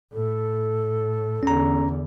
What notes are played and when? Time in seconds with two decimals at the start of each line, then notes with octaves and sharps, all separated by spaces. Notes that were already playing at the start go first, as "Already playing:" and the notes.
0.13 A2 A4
1.43 E2 D3 C#4 A#5